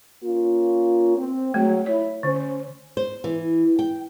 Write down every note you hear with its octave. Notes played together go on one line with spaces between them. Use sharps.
A#3 C#4 F4
C4
F#3 G#3 A3
E4 C#5
D3 C#4 C5
C5
E3
G5